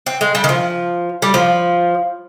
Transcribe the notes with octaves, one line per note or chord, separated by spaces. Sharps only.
C4
G#3
G3
D#3
F3
G3
F3